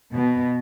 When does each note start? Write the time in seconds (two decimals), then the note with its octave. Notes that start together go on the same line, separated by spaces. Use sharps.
0.13 B2